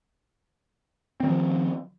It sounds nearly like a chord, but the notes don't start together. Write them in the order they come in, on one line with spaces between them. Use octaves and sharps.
C4 D#3 F3